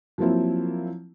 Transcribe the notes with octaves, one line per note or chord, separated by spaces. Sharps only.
F3 F#3 A#3 C4 E4